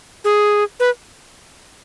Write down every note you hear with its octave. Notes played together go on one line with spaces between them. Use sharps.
G#4
B4